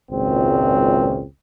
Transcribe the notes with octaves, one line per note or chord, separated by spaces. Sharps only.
G#1 C#2 A#2 C4